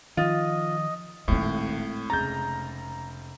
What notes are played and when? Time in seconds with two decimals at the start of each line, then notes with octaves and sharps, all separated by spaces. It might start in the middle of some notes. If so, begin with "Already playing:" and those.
0.17 D#3 F3 F4 D#5
1.28 D#1 D#2 A2 G#3 C4
2.10 F1 C#3 A#5 G6 A6